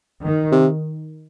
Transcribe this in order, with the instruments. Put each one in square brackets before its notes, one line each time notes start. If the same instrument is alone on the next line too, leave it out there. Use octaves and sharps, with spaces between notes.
[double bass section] D#3
[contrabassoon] C3